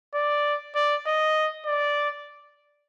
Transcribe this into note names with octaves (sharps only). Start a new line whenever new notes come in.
D5
D5
D#5
D5